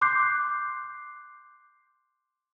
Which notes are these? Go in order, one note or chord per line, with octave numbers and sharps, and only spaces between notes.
C6 D6 F#6 G6 C7